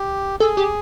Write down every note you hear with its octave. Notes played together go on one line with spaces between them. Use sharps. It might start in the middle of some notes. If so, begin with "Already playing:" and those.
Already playing: G4
G#4 A4
G4